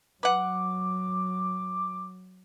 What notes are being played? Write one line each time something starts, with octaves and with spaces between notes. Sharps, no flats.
F#3 B4 F#5 D6